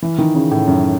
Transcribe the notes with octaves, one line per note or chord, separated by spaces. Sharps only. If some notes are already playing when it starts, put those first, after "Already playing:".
E3
D#3
C#3
A2
F#2